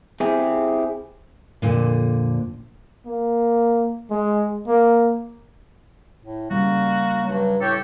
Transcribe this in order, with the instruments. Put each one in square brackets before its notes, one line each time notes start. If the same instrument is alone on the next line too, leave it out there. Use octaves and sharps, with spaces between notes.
[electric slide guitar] C4 E4 G4 G#4
[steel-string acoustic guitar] F2 A#2 D3
[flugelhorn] A#3
G#3
A#3
[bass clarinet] A2
[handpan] C#3 G3 [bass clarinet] A#3 [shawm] F#4
[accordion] G2 [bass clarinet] F#3
[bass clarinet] A2 [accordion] G4 C#5 [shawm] A4